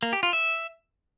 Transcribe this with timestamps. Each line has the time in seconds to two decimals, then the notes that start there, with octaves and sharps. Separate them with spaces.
0.03 A#3
0.13 G4
0.23 F4
0.33 E5